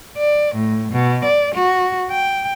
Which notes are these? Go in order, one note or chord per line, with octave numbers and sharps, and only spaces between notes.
D5
A2
B2
D5
F#4
G5